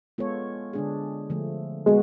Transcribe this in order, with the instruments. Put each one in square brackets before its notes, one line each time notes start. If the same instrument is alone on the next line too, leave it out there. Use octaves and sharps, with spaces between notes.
[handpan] G#3 B3 F4 A4 C#5
D3 G#3 D4 G#4
D3 F3 A3
[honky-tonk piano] G#3 [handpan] B3 F#4